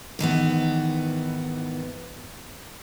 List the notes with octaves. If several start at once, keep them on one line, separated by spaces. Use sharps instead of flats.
G#2 D#3 E3 B3